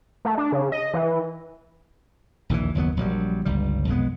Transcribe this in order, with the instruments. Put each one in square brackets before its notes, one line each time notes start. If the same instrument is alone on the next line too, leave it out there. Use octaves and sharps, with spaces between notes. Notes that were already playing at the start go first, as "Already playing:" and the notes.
[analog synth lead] A3
D4
C#3
D#5
E3
[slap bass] A#1 D#2 C#3 E3
F#1 D#2 F#3 B3
A#1 F#3 G3
G1 C#2 G3
B1 F2 G#3 B3